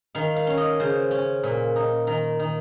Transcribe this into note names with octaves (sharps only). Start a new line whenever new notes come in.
D#3 F5
F5
C#4 F5
D#5
C#3 C5
C#4
A#2
D#4
D#3 A#4
D#3